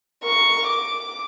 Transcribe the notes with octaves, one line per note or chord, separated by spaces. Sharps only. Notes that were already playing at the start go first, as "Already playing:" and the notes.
A#4 C#6
D6